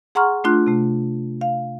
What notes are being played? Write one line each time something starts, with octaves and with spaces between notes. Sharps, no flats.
G#4 F#5 A#5 C6 C#6 F6
A3 D4 F4 C6 F#6
C3 A3
F5